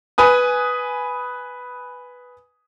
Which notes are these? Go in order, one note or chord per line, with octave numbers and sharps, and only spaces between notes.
B4 G#5 D#6